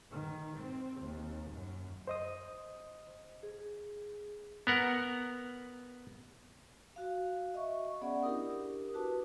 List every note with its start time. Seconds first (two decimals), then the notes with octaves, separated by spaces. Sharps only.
0.11 D#3
0.57 C4
1.01 D#2
1.51 F#2
2.07 C5 D#5 D#6
3.43 G#4
4.67 B3 A#4 F#5
6.96 F#4 F5
7.54 D#5 E5 C#6
8.01 B3 C#4 G#4 D5 F#5
8.23 D4 E4 G4 A#4 D#6
8.94 F#4 B4 A5 D6